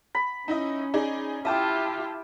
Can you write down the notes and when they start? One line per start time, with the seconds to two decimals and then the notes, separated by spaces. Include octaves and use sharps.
0.15 B5
0.48 C#4 D#4 E4 D#5
0.94 D#4 G#4 D5
1.45 E4 F4 G4 E5 G5 A5 D6 D#6